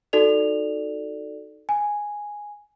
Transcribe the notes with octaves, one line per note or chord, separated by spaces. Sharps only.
D#4 F#4 A4 D5 F7
G#5